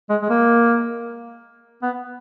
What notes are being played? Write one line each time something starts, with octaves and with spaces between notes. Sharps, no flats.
G#3
G#3
A#3
B3